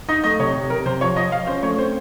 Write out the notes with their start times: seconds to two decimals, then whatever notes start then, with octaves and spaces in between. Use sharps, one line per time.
0.09 D#4 D#5
0.24 A3 D#5
0.39 C3 C#5
0.55 C3
0.70 C3 A#4
0.86 C3 C5
1.01 F3 C#5
1.16 F3 D#5
1.32 F3 F5
1.47 C#4 C5
1.62 A3 C#5
1.78 C4 C5